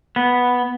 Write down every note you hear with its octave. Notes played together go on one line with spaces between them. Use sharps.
B3